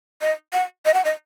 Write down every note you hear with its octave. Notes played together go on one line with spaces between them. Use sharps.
D#5
F#5
D#5
F#5
D#5